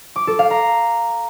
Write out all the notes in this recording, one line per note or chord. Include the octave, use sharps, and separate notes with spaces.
D6
A4
F5
A#5